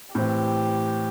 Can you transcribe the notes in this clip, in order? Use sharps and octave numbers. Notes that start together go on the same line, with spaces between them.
A2 E3 C4 G4